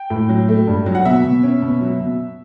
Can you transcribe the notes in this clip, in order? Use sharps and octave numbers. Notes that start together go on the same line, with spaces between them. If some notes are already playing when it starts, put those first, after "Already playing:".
Already playing: G5
A2
F#3
A3
G2
F#3
F#5
B2 E5
B2
C#4
B2
F#3
B2